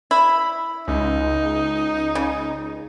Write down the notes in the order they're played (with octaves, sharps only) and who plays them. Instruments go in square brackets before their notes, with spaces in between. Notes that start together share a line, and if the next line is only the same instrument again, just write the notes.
[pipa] E4 [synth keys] B5
[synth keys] C#2 [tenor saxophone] D#4
[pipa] C#3